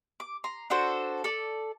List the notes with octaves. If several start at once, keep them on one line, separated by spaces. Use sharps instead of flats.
D6
A#5 C6
D4 F#4 A4 C5
A4 D5